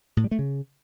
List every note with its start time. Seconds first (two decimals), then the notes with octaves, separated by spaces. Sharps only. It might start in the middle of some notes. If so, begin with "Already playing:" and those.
0.17 A2
0.24 G3
0.31 A3
0.39 C#3